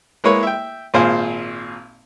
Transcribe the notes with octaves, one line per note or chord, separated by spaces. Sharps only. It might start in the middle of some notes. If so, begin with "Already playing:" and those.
G#3 A#3 E4 B4 C#5
E5 G5
G#1 A#2 G#4 C5 F5